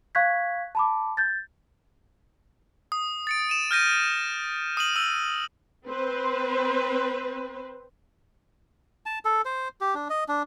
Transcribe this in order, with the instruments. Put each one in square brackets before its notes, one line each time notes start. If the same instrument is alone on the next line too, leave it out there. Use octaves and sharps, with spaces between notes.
[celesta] F5 C#6 F#6 G#6 B6
A5 B5 D6
G6 A6
[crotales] D#6
A6 C#7 D7
D#7 E7
F6 G6 A#6 D#7
D#6 D#7 F#7
E6 D#7
[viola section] C4 B4 C5
[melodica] A5
A4
C5
G4
D4
D#5
D4